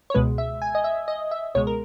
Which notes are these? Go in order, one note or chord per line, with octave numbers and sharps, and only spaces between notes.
C#5
C#2 B2 G#3 B4
E5
G#5
D#5
E5
D#5
E5
C#2 B2 G#3 C#5
A#4